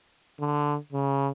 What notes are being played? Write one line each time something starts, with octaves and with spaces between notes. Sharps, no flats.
D3
C#3